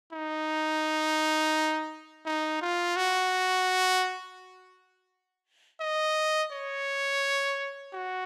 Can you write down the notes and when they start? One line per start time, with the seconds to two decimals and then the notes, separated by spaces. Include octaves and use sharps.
0.13 D#4
2.26 D#4
2.61 F4
2.97 F#4
5.81 D#5
6.52 C#5
7.93 F#4